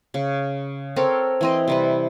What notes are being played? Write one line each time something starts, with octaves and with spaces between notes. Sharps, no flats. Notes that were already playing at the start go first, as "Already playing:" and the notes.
C#3
C4 A4 A#4 C#5
E3 C4 D#5
C3 G3 B4